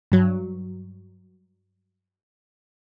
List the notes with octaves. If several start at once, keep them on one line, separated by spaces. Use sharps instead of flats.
G2 F#3